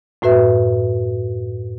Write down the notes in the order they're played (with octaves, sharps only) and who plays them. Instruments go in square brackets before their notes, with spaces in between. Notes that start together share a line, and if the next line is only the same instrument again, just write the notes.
[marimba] F#2 A2 F#4 B4 E5